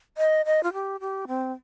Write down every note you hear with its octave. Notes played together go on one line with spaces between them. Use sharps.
D#5
D#5
F4
G4
G4
C4